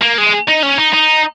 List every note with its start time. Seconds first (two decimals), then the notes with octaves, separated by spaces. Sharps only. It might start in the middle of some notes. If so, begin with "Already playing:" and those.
0.02 A#3
0.18 G#3
0.49 D#4
0.63 C#4
0.78 D#4
0.94 D#4